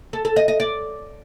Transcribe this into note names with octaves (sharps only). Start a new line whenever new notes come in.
A4
A4
D#5
D#5
D5